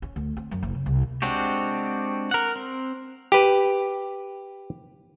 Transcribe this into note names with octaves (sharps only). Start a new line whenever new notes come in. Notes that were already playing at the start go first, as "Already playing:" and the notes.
C#4
D2
C4
F#2
F#1
C#3
C2
G#3 C4 D4 F#4 G4
A#4 F#5
C4
G4 B4